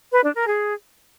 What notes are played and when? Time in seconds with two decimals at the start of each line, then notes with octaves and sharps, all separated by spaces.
0.11 B4
0.23 D4
0.35 A#4
0.47 G#4